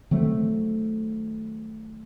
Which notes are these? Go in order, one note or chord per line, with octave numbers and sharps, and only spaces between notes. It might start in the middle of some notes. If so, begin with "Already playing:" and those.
D#3 F#3 A3 C4